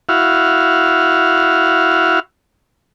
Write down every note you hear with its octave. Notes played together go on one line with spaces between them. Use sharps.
E4 F#4 F5